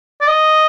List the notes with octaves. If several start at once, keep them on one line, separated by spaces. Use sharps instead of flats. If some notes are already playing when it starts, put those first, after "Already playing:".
D5
D#5